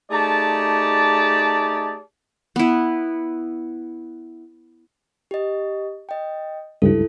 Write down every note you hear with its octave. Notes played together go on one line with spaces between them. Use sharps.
A3 D#4 G4 G#4 D5 A5
B3 E4
G4 D#5
D#5 G5
C#2 G2 E4 A4